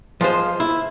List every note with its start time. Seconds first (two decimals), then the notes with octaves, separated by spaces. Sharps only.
0.21 F3 G#3 F4 C5
0.60 E4